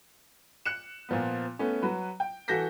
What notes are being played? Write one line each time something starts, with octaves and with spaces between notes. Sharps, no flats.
F#6 C#7 E7
A#2 F3 B3
A3 B3 C#4
F#3 F#4 B4
G5
E3 F#4 A4 G6 A#6 B6